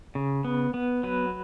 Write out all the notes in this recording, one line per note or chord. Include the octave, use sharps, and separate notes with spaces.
C#3
B3
B3
F#3 B4